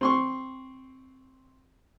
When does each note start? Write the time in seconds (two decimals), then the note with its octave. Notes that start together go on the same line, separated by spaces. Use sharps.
0.01 C4 C6 C#6